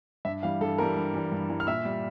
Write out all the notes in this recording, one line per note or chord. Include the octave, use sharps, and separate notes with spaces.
G2 E5
E3 G3 F5
G2 A4 A5
E3 G3 A#4 A#5
G2
E3 G3
G2
E3 G3
F6
A#2 E5 E6
G3